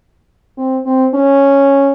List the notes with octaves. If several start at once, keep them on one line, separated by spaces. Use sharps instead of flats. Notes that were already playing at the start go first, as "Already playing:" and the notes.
C4
C4
C#4